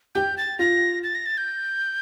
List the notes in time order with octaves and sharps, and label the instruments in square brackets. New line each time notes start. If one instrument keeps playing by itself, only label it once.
[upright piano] G4 [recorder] G6
[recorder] A6
[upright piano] F4 [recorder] A#6
[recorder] A6
A#6
A6
G6